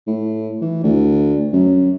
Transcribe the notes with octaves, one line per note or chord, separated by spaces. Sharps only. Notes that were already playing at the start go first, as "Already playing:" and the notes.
A2
E3
D2
F#2